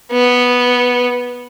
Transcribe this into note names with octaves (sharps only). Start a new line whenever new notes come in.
B3